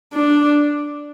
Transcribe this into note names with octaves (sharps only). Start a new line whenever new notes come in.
D4